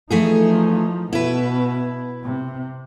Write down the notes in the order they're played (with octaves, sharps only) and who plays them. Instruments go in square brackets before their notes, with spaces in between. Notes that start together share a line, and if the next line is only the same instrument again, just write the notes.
[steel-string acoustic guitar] E3 A3 G#4 [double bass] F3 D#4
[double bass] B2 [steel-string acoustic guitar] E4 B4
[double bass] C3